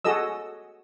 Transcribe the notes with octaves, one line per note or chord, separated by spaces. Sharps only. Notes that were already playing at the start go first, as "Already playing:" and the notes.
F#4 G#4 A4 D#5 E6